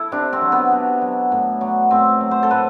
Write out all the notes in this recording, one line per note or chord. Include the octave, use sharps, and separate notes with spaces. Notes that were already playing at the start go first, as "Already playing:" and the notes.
Already playing: E4 A4
C3 D4
C4
F#3
B3
C3
F#3
A2
F#3
A2 C4
F#3
C5
A4
A2 B4